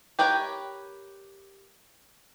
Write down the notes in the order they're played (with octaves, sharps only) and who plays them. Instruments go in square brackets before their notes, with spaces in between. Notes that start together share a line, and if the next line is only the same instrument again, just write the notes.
[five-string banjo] G4 A#4 B4 C#5 G5